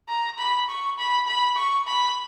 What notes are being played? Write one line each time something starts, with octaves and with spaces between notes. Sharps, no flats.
A#5
B5
C#6
B5
B5
C#6
B5